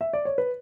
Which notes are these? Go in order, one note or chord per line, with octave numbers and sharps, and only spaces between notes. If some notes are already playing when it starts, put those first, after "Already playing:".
E5
D5
C#5
B4